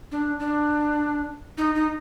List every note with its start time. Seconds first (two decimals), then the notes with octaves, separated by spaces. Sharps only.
0.12 D4
0.40 D4
1.58 D#4
1.75 D#4